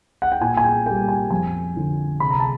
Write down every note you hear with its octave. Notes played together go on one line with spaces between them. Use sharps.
F#5
G5
A#2 G#5
G#5
G5
G3 A#3 G5
G#5
F2 G#5
D3 F3
C3 B5
A#5
A5